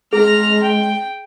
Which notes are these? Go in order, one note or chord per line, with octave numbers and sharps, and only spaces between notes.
G#3 G#4 A#5 F6
G5